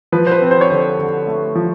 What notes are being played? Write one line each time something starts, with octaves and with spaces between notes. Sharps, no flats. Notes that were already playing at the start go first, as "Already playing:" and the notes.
F3 B4
C5
B4
C4
C5
C#5
D3 C5
D3
A3
F3